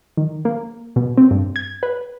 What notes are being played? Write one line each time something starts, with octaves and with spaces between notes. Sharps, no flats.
D#3
A#3
B2
C4
G2
G#6
B4